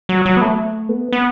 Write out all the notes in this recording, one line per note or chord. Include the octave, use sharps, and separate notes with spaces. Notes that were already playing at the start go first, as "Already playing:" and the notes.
F#3
F#3
B3
A3
B3
B3